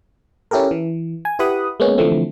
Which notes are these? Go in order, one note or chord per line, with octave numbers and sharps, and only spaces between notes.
C#4 E4 G4 A4 A#4
E3
G#5
E4 G4 B4 F#5 B5 D#6
G#3 A#3 B3 C#4
D3 E3 F3 A3 C4